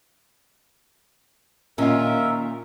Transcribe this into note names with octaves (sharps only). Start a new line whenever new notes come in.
A#2 D#3 C#4 F4 A#4 E5